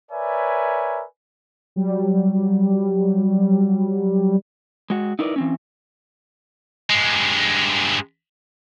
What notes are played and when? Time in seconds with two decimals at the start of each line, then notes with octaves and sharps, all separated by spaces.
0.11 A#4 B4 C#5 D5 E5 G#5
1.76 F#3 G3
4.90 G#3 F#4
5.19 D#4 E4 A#4 B4 D5
5.36 E3 C4 C#4
6.90 G2 G#3